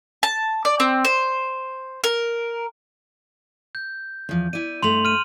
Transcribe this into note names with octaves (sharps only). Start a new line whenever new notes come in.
A5
D5
C4
C5
A#4
G6
E2 F3
E4 D5 D#7
G2 A3 C6 F7 F#7
F6 D#7